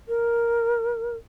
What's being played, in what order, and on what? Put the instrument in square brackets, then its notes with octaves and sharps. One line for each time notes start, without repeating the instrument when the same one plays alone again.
[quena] A#4